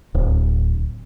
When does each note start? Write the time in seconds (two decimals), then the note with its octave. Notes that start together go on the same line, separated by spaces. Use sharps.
0.15 D1